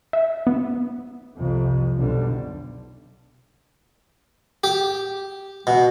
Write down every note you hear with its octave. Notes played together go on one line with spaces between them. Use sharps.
E5
B3
C2 F2 C3
B1 D3 G3
G4
B2